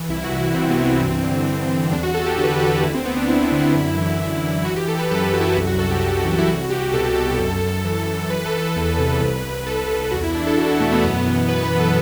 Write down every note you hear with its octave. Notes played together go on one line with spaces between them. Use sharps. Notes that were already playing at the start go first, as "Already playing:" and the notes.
Already playing: E3
C2 E4
F#4
C2
E4
C3 C4
B3
E3
C4
G2
D3
D3
G2
E2 D4
F#4
E2 A4
G4
D3 A4
B4
A4
D3 A4
F#4
D2 E4
C4
D2 B3
D4
D2 E4
D3
E4
F#2
E3
F#2
E3
E3 F#4
G4
E3 A4
B4
F#2 A4
F#2 F#4
E4
F#4
C2
F#4
C2 A4
G4
C2
E3
E4
C2 F#4
C2 G4
B2 A4
B2 A4
F#2
F#2
E3
F#2
E3 B4
A4
E3
B4
E2
C3
C2
C2
C2 A4
C2
E2 F#4
E4
E2 D4
A4
E2 F#4
F#4
B2 A3
B3
F#2 B3
B3
E3
E3 B4
B4
E3
A4